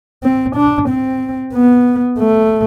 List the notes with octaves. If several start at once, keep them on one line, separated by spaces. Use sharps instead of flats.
C4
D4
C4
B3
A3